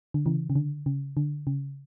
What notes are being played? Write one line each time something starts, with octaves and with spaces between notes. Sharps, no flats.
D3
C#3 E3
C#3
D3
C#3
D3
C#3